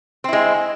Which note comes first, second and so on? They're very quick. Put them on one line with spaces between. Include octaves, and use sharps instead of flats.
C4 E4 G#3